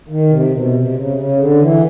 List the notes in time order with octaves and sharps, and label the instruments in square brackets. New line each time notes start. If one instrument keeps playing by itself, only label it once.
[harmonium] D#3
C3
B2
C3
C#3
C#3
D3
E3